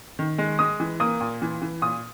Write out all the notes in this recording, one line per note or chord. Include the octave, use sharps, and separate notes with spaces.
D#3
G#3
G#3 D#6
E3
A#3 D#6
A#2
E3
E3
A#2 D#6